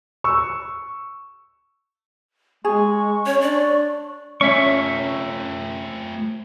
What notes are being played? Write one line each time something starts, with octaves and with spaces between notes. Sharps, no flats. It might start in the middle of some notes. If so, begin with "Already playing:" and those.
C#6 E6
G#3 G#4 C#6
C#4 C#5
D4 D5
A3 C#4 F4 E5 C#6